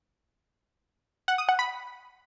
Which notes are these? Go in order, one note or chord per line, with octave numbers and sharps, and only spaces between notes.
F#5
D#6
F#5
B5